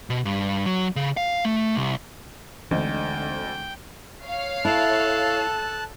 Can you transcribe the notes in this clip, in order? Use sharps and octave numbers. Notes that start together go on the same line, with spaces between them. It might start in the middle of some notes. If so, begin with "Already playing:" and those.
B2
G2
F#3
C#3
F5
A3
C2
D2 D3 E3 G#3 C4 D#4 G5
C#5 F5
E4 A4 A5 F#6